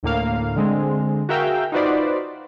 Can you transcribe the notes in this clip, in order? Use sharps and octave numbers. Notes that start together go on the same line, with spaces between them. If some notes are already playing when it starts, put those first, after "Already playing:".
D2 A2 A#3 F5
D3 G#3 C4
F#4 G#4 A#4 E5 F5 G5
D#4 F4 F#4 B4 C5 D5